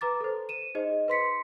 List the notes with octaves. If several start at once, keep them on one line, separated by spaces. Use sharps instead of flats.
B4 A#5 D6 A6
A4 C5
D#7 E7
D#4 G#4 C5 D#5
B4 C6 B6 C#7